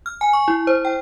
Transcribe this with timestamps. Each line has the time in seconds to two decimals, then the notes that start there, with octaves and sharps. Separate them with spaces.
0.06 F6
0.21 G#5
0.33 C#6
0.48 E4
0.67 C5
0.85 G5